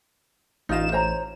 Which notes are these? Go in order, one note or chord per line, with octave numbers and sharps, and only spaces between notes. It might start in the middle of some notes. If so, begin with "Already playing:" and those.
A1 D#4 F4 F5 E7
C5 C#5 A#5